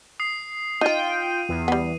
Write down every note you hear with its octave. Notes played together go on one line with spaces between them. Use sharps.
D#6 C7
D#4 F4 D#5 G5 D#7
E2
G3 B3